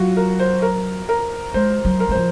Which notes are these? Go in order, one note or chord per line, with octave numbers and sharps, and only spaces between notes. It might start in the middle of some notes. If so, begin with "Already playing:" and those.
Already playing: F#3 F4 F#4
A#4
C5
A#4
A#4
G#3 C5
F#3
A#4
F#3
F3 C5